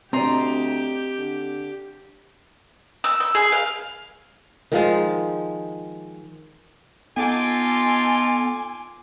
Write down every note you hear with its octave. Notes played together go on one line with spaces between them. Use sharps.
D2 C4 G4 D5 D#5 A#5 C6
D3
E6
E6
G#4
F5
D#3 F3 G#3
B3 D#4 F4 A4 G#5 D6